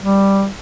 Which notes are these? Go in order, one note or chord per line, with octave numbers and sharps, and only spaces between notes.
G3